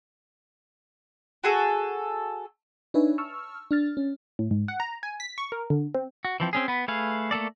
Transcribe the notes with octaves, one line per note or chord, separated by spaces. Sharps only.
F#4 G#4 A4
D4 D#4 B4 C#5 E5 G#5
A5 C#6 E6 F6
D4 F6 A6
C#4
A2
G#2
F#5
A#5
G#5
B6
C#6
A#4
D3
C4
F#4
E3 F3 C4
C4 C#4 G#4
B3 B4
A3 G#4 B4 F5
A3 A#3 A4 D5